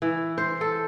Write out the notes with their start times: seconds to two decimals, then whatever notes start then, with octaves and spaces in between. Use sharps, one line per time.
0.02 E3
0.38 C5
0.61 A4